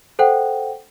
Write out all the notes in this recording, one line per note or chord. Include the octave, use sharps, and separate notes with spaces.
A4 C5 F#5 G5